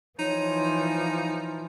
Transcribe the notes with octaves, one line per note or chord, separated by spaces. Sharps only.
E3 F3 D#4 C#5